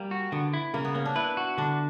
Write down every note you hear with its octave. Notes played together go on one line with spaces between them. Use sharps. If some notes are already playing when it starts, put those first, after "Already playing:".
Already playing: G3 A#3
F#4
D3 B3
E4
C#3 A#3
B3
A#3 C#4
D4
E4 B4
F#4
D3 D4